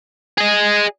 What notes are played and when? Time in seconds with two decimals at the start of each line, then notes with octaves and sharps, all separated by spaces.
0.38 G#4 D#5